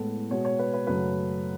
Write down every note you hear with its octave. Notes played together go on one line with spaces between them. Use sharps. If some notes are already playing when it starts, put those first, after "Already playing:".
Already playing: A2 G#3 B3 A4
B2 G#3 B3 C#5
C#5
B4
B4
F#2 C#3 F#3 A3 B4